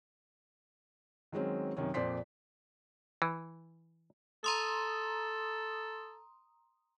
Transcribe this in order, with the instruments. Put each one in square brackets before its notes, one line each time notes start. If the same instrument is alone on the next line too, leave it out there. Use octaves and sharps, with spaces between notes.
[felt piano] D#3 F#3 G#3 C4 C#4
F#2 C3 D#3 C#4
F2 A#2 C5 D5 C6 B6
[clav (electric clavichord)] E3
[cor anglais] A4 [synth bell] A#5 C6 D#6